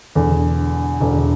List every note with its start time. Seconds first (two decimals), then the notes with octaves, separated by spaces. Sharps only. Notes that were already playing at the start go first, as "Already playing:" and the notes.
0.15 E1 E2 D3
1.00 E1 E2 D3